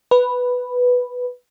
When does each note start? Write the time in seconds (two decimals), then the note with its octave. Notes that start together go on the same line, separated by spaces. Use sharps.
0.11 B4